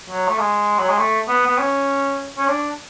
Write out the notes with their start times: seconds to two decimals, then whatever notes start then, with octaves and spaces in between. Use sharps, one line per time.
0.10 F#3
0.28 A3
0.39 G#3
0.78 F#3
0.89 G#3
0.98 A3
1.28 B3
1.46 B3
1.59 C#4
2.38 C#4
2.48 D4